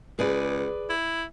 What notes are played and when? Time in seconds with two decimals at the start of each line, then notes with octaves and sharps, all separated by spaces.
0.19 C#2 G#4 B4 D5
0.90 E4